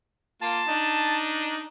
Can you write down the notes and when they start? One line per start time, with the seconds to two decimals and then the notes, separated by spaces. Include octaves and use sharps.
0.42 A#3 F4 A5
0.67 D4 D#4